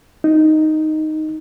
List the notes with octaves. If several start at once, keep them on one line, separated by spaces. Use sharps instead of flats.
D#4